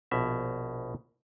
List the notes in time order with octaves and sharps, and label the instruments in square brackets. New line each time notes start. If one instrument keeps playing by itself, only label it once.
[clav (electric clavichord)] A#1 B2 E5